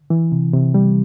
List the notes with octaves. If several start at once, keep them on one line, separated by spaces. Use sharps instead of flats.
E3
C3
C3
G3